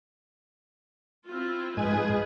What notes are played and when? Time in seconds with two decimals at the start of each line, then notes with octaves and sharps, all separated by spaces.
1.28 C4 E4 F4
1.77 G#2 F3 G#3 G#4 B4 G#5